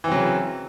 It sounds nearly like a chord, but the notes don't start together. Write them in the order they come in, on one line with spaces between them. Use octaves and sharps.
E3 C4 F#3 C#3